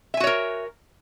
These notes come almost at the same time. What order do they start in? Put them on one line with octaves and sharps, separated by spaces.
E5 G#5 F#4 C#5 A#4